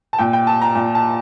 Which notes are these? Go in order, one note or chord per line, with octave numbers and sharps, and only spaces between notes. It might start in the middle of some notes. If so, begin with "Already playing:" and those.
A5
A#2 G5
G5
A5
A#5
A#2
A5